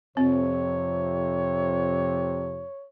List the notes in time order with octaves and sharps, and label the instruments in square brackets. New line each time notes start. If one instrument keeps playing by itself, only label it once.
[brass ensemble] F2 C3 [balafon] C4 [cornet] C#5